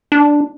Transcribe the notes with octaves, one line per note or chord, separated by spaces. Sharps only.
D4